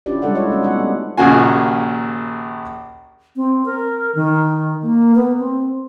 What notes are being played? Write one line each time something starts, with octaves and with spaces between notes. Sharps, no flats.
C#4 D4 E4 F4 G4 D5
G3 G#3 D4 A4 D5 F#5
E4 F4 C#5 D#5
A3 C#4 F#4
B3 D#4 D5 F#5
C4
A#1 D#2 C#3 A#3 F#4 G#5
C4
A#4
D#3
A#3
B3
C4